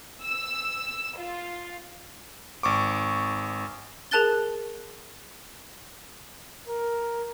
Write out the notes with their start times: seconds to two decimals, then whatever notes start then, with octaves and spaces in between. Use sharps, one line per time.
0.24 E6
1.18 F4
2.63 G#1 C#6 D6
4.11 G#4 A#4 A5 F#6 A6 G7
6.68 A#4